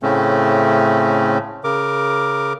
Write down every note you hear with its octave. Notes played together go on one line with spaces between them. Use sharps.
A2 C#3 A3 C4 C#4
C#3 A#4 D6